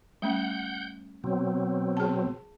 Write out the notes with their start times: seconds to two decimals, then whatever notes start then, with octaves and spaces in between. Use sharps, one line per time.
0.22 G3 A3 C#4 F#5 G6
1.24 B2 F#3 C4
1.97 G#4 A5